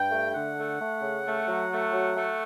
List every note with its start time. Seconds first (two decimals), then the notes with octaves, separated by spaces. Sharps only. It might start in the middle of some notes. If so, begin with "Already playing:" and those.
Already playing: G2 G5
0.11 A3
0.34 D3 F#5
0.57 A3
0.79 A3
1.02 C#3
1.25 A3
1.48 F#3
1.71 A3
1.94 F#3
2.16 A3